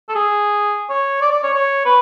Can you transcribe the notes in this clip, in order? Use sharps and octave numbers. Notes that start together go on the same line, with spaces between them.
A4
G#4
C#5
D5
D5
C#5
C#5
B4